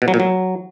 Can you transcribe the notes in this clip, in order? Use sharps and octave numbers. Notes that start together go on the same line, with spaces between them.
B2
F#3
A#2
F#3